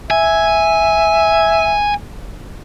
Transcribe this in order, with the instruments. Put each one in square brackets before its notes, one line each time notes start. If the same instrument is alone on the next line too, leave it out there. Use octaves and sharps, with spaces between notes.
[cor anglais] E5 [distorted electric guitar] G#5